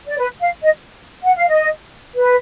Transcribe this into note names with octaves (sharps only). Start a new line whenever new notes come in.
D5
B4
F5
D#5
F#5
F5
D#5
B4